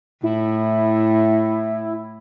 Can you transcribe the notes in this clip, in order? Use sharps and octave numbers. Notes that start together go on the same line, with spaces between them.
A2 E4